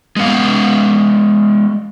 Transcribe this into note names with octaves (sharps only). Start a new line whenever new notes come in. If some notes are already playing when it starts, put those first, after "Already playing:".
G#3 B3 F5